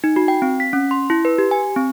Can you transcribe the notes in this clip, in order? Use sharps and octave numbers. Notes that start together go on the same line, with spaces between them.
D#4
F#4
G5
C4
B6
C#4
C6
E4
B4
G4
G#5
C4